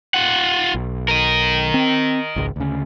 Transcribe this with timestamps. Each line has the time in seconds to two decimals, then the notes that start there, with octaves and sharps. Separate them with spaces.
0.14 F4 F#5
0.74 B1
1.08 A#4 D#5
1.74 C4
2.36 G#1 C#2
2.56 D2 C#3